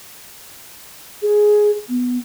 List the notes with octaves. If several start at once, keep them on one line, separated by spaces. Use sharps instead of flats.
G#4
B3